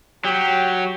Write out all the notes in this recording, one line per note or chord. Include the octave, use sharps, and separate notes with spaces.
F#3 G4